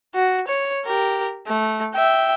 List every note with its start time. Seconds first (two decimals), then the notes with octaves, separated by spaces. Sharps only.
0.15 F#4
0.48 C#5
0.86 G4 A#4
1.47 A3
1.95 E5 G5